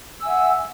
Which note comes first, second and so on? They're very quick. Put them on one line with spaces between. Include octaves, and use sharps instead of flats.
E6 G#5 E5 F#5